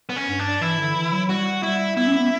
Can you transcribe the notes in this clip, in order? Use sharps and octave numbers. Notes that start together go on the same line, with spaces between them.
B3
C#4
G2
D4
E3 E4
D3
E3
F#3
G3 F#4
G3 E4
B3 E4
C#4
B3